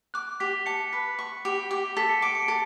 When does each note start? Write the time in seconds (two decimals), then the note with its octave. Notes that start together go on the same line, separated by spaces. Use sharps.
0.14 D6 F#6
0.40 G4 B6
0.66 A5 C#7
0.92 B4 B6
1.19 C#6
1.45 G4
1.71 G4
1.97 A4 B6
2.09 C#7
2.22 D6 D7
2.35 C#7
2.42 D7
2.48 A4